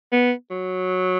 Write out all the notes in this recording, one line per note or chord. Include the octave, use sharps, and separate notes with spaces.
B3
F#3